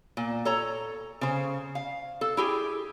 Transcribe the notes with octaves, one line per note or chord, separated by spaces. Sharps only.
A#2
A4 C#5 A#5
C#3 C5
F5
A4
E4 G4 G#4